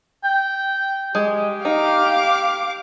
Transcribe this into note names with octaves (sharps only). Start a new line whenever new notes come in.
G5
G#3 G4
D#4 F5 D6